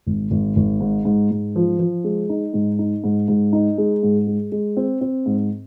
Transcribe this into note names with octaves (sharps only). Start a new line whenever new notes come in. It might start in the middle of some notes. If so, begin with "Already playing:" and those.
G#1
G#1
G#1
G#2
G#2
G#2
F3
F3
G#3
D#4
G#2
D#4
G#2
G#2
D#4
G#3
G#2
G#3
G#3
C4
C4
G#2